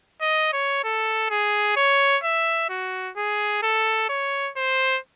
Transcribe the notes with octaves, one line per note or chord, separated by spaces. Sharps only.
D#5
C#5
A4
G#4
C#5
E5
F#4
G#4
A4
C#5
C5